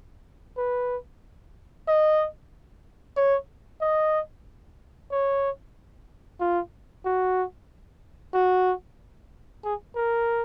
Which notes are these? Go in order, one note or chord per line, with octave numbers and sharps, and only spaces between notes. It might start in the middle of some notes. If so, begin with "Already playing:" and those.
B4
D#5
C#5
D#5
C#5
F4
F#4
F#4
G#4
A#4